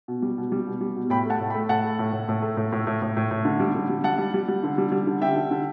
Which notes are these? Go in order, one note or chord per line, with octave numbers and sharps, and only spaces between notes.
B2
G3
B2
G3
B2
G3
B2
A2 G5 B5
A3 F#5 A5
A2
G5 B5
A3
A2 F#5 A5
A3
A2
A2
A2
A3
A2
A2
A2
A2
A2
A2
D3
G3
D3
G3
G3 F#5 A5
G3
G3
G3
D3
G3
G3
D3
D3 E5 G5
D3
D3